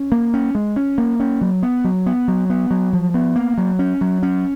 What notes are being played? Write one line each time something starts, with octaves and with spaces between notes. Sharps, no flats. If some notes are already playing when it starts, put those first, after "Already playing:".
Already playing: C#4
A#3
C#4
G#3
C#4
A#3
C#4
F#3
B3
F#3
B3
F#3
B3
F#3
F3
B3
A#3
F#3
C#4
F#3
C#4